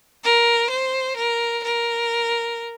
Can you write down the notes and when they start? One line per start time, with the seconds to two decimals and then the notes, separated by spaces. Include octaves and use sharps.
0.24 A#4
0.70 C5
1.17 A#4
1.64 A#4